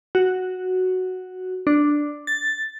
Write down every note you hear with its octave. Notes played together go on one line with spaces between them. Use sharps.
F#4
D4
A6